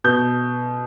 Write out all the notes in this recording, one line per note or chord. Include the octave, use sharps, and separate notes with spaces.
B2 G6